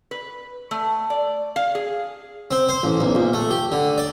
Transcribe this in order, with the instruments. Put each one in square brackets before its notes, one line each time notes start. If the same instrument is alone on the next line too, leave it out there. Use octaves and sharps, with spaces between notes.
[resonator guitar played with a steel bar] B4
A3
D5
F5
G#4
[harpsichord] C4
C5
A1
B1
A#1
A3
G4
D3
D5